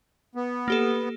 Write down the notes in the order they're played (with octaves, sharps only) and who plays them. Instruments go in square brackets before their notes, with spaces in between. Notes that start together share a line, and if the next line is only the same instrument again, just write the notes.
[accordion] B3
[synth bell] A#3 G4 A4